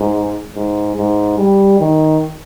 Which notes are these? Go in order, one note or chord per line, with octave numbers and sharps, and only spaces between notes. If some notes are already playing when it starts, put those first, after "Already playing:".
Already playing: G#2
G#2
G#2
G3
D#3